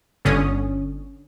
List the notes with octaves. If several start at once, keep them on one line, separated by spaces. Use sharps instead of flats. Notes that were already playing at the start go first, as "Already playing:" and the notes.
G1 D3 C#4 D#6